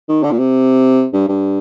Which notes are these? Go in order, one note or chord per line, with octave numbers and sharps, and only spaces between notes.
D#3
D3
A#2
C3
G2
G2